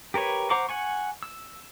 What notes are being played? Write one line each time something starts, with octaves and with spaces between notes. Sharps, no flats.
G4 A#4 B4 C#5
C5 F#5 A#5 C#6 D6
F#5 G#5 C#6
E6